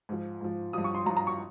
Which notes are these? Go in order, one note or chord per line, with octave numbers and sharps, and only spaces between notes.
G#2 F3
G#2 F3
G2 F3 D#6
C#6
C6
G2 F3 A#5
A#5
C#6